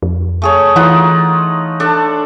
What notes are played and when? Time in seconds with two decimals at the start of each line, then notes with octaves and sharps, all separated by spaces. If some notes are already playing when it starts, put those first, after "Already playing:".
0.02 F2
0.42 A3 G#4 C#5
0.76 E3 D#4 F4 F#5
1.80 D4 A4